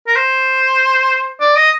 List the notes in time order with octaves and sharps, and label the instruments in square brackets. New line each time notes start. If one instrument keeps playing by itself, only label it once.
[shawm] A#4
C5
D5
D#5